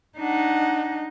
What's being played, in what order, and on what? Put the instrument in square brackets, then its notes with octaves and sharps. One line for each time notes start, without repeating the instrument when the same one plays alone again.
[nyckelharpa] D4 F#5 [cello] D#4